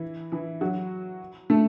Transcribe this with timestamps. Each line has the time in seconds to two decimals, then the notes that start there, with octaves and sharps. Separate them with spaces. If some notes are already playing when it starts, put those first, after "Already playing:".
Already playing: E3 E4
0.32 E3 E4
0.61 F#3 F#4
1.50 A3 A4